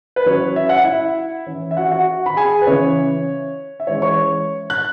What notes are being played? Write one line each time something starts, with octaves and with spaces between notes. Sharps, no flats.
B4
F#3 C#4 E4 C#5
E5
F#5
E4 E5
E3 C#4 E4
E5
F#4 F#5
F#4 F#5
B5
G#4 G#5
B4
C#3 E3 C#4 E4 C#5
E5
E3 G#3 C#4 E4 C#5
C#5 C#6
F#6